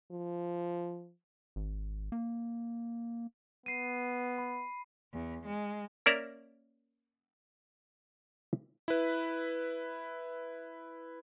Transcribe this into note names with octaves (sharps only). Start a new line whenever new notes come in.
F3
G#1
A#3
B3 C7 D#7
B5
E2
G#3
A#3 C#4 A#4 D5 E5 A#5
E4 B4